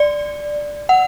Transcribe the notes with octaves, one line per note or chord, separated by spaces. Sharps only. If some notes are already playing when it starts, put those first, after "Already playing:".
Already playing: D5
F#5